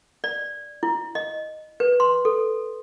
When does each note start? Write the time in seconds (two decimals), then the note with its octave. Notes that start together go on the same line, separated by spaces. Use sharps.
0.24 D5
0.83 E4
1.15 D#5
1.80 B4
2.00 C6
2.25 A4